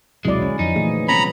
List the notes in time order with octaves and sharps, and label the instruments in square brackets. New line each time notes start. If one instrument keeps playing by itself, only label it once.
[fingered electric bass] D#1 B1 C3 [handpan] F#3 E4 D5 [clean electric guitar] G#3
[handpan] D3 C#4
[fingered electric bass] F2 [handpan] F3 [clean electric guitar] D#4
[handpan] A#2 E3 G#4 [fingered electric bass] A3
[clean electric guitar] C2 B3 C#4 [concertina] A#5 B5